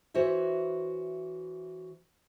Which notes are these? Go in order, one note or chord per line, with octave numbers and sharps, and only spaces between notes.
E3 F#4 C5 C#5 E5